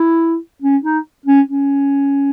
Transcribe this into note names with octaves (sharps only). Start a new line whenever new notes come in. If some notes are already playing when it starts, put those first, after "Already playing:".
Already playing: E4
C#4
D#4
C#4
C#4